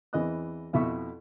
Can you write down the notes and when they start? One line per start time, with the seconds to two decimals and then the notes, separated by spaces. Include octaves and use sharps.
0.13 E2 E3 C4 D#5 D#6 F#6
0.73 F2 B2 E4 E5 C#6